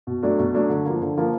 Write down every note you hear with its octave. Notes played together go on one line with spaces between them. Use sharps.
B2
F#3 A3 D4
B2
F#3 A3 D4
D3
F3 A#3
D3
F3 A#3